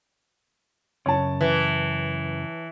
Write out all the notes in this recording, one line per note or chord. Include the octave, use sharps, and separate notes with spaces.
F#2 C#3 C#5 A5
E3